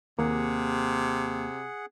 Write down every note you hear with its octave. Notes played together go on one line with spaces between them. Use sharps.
D#2 C3 A#3 G#4 F#5